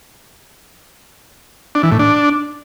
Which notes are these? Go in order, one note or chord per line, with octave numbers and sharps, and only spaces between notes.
D4
E3
A2
D4